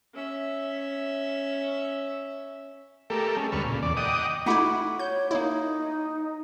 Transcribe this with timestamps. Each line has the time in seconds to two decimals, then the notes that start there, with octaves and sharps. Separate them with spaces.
0.14 C#4 E5
3.10 A3 G4 A4 A#4
3.37 G#3 C#4
3.52 D2 G2 A4 B4 C#6 F6
3.64 A#2 C#3
3.83 E2 D5
3.97 D#5 F#5 G5 D6 D#6
4.46 A3 D#4 E4 F#4 B5 D6
4.99 C#5 G6
5.31 A#3 D#4 E4